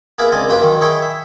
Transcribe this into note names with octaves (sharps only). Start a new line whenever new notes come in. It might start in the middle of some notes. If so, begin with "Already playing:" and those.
A#3 B3 E4 G#4 A#4
C#2 C4 D4 D#5 G#5
F#2 A#3 G4 B4 C6
D#3 F#3 C#4
D#4 E4 G#4 C#5 G5
E5